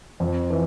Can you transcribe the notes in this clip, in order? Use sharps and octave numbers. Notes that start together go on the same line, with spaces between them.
F2
E3